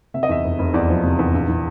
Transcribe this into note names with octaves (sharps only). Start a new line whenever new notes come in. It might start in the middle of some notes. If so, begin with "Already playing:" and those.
C3 E5
D#5
E2 E5
F1
F1
E2 D5
F3
C3
E2
A#1
E3